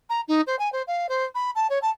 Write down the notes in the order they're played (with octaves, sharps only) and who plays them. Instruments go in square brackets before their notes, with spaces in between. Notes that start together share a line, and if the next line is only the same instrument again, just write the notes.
[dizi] A#5
D#4
C5
G#5
C5
F5
C5
B5
A5
C#5
A5